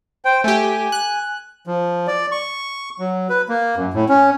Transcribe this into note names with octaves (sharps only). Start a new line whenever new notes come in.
C5 G5
A3 G4 G#5
F#6
F3
D5
C#6
F#3
B4
A#3
F#2
A2
C#4